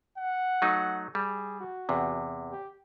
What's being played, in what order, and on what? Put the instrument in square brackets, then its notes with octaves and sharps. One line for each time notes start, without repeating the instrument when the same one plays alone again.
[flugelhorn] F#5
[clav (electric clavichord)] F#3 A3 D#4
[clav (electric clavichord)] G3 [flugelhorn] G#4
[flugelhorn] F#4
[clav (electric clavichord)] E2 C3
[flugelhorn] G4